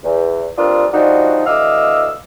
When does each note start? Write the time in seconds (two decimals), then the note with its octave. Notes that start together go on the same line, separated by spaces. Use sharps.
0.04 E2
0.57 G2 C4 D4 F4 A#4 D#6
0.93 F3 G3 D4 D#4 F#4
1.46 D2 E3 D#5 F5 D6 E6